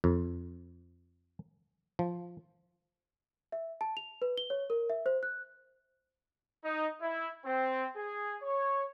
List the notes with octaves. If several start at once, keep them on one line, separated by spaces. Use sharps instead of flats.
F2
F3
E5
A5
F7
B4
G7
C#5
A#4
E5
C5
F#6
D#4
E4
C4
G#4
C#5